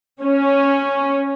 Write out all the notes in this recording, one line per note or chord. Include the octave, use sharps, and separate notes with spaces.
C#4